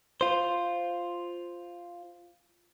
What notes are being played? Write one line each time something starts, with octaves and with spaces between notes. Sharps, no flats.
F4 C5